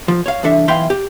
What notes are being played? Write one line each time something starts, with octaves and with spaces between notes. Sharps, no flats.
F3
C#5 F5
C2 E3 D4 A4 E5
B1 E3 E5 F5 G5 C6
G4